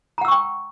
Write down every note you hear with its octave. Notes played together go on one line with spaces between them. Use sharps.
F#5 G5 A#5 C#6 E6